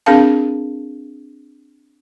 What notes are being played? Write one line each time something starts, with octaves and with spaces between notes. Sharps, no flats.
C4 D4 G#4 A#4 F5 A5